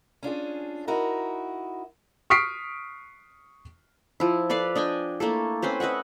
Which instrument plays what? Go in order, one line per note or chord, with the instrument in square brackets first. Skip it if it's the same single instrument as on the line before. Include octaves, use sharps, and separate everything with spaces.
[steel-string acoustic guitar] C#4 D4 F4 G#4
D#4 E4 F#4 A#4
[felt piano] C#6 D#6 F6 B6 C7 D7
[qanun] F3 E4
A4 B4 D5 F5
D4 D#5 G5 G#5
A3 A#3 E4 A4
C4 C#4 B4 C5
B4 D#5 E5 F#5